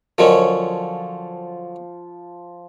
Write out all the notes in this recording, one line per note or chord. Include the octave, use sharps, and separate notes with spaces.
D3 F3 F#3 C#4 A#4 D#5